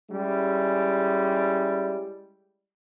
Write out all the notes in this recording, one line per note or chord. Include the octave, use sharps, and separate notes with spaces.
G3 G#3 C#4 E4